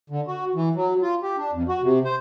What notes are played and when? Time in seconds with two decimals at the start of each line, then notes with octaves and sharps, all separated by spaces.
0.10 D3
0.28 F#4
0.55 E3
0.75 F#3
1.02 F4
1.22 G4
1.37 D4
1.53 F2
1.68 F#4
1.82 C3
2.05 C5